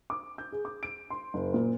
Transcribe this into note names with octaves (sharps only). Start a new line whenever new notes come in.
D6
G6
G#4
D6
D7
C6
F#1
A#2